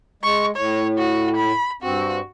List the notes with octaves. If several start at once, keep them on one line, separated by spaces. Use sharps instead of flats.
G#3 C#6
A2 C#5
F#4
B5
G2 C4 F#4